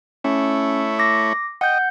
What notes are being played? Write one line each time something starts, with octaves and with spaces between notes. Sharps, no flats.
A3 C#4 E4 C#5
D6 A#6
D#5 F#5 G5 G6